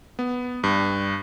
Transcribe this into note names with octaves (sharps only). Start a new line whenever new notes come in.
B3
G2